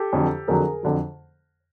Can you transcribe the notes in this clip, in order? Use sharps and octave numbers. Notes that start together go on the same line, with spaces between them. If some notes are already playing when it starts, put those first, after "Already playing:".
Already playing: G4 A4
F2 D3 F#3
F2 D3 F#3 G#4 A#4
F2 D3 F#3